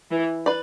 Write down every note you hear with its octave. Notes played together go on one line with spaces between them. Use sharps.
E3
B4 D5